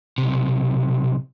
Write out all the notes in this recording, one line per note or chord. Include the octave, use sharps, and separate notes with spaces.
B1 C3